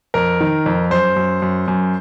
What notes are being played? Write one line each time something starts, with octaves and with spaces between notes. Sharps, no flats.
F2 A#4
D#3
F2
F#2 C5
F#2
F#2
F#2